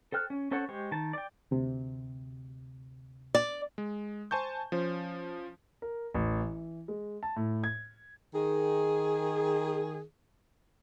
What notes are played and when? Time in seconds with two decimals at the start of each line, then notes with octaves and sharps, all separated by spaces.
0.12 A4 C5 G5 F6 F#6
0.30 C#4
0.51 C#4 A4 C5 C#5 F#5
0.69 G#3 G4 C5 C#6
0.92 D#3 A5
1.13 D5 G5
1.51 D2 C3
3.35 D5
3.78 G#3
4.31 C5 G#5 A5 C#6 G6
4.72 F3 C#4 C5
5.82 A#4
6.14 A1
6.40 E3
6.88 G#3
7.23 A5
7.36 A2
7.64 G#6
8.34 D#3 G#4